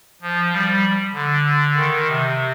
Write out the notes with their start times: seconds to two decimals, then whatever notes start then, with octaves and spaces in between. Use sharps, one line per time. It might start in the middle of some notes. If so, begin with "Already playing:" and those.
0.22 F3
0.52 G3
1.14 D3
1.76 D#3
2.07 C3